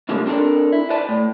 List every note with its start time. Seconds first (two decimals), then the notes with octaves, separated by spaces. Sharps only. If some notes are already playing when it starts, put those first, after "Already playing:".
0.09 A2 C#3 F3 G3 G#3 A#3
0.26 C4 D4 F#4 A4 A#4 D5
0.73 E4
0.90 B4 C5 D5 A5
1.09 A2